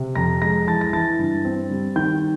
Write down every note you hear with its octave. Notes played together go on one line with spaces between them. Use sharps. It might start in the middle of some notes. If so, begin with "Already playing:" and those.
Already playing: C3
F2 A#5 A#6
G#3 A#5 A#6
E3 A5 A6
A#6
E3 A5 A6
G2
C4
G3
D#3 G5 G6